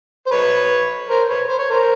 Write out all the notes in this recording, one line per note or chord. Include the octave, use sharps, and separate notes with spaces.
C5
B4 C#5
A#4 C5
B4 C#5
C5
C#5
A#4 C5